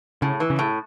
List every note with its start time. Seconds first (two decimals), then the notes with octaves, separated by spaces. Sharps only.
0.22 A2 C#3
0.40 E3
0.50 C#3
0.59 A2